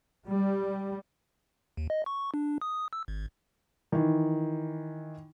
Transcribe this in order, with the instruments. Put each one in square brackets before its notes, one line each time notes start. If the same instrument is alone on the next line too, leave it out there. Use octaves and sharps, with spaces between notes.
[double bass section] G3
[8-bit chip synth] D#2
D#5
C#6
D4
D#6
E6
G#1
[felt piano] D#3 E3